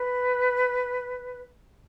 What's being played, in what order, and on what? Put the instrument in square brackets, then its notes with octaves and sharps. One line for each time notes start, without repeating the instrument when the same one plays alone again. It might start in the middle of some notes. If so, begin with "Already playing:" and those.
Already playing: [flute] B4